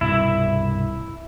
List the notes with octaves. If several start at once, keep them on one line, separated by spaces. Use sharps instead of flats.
C2 G2 B2 E4